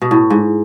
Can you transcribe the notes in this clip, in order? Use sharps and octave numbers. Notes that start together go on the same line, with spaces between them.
B2
A2
G#2